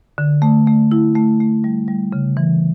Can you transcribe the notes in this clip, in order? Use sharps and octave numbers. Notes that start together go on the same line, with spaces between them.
D3
A3
A3
E4
A3
A3
G3
G3
C#3
E3